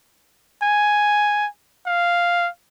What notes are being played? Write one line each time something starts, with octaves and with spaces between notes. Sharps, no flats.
G#5
F5